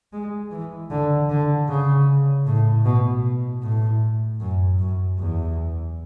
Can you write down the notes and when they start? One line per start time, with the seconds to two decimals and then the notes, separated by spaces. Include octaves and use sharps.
0.13 G#3
0.51 E3
0.91 D3
1.30 D3
1.68 C#3
2.46 A2
2.85 B2
3.62 A2
4.40 F#2
4.79 F#2
5.18 E2